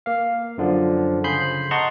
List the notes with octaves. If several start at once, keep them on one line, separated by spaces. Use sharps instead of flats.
A#3 F5
F#2 D3 F3
C#3 G#4 B5 C6 G6 C7
D#5 F#5 A5 A#5 C6 C#6